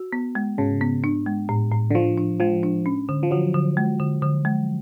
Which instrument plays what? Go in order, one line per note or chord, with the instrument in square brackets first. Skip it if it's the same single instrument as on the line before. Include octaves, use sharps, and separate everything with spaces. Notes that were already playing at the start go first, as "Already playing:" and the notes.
Already playing: [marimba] F#4
B3
G#3
[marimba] G#2 [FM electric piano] C#3
[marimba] B3
D4
G#3
A2
A2
[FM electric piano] D3
[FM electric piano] F3 [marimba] D4
[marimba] D4
[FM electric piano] F3 [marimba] G#3
[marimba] D4
C#4
D3
[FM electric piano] F3
[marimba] D3 [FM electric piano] F#3
[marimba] D3
G#3
D3
D3
G#3